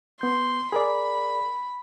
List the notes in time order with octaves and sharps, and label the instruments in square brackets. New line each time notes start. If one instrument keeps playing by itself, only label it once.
[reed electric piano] B3 G6 [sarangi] C6
[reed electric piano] G#4 A#4 D5 [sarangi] B5